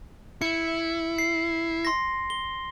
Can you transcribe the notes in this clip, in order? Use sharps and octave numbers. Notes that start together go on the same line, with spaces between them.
E4 C#7
C7
C6 A#6
G7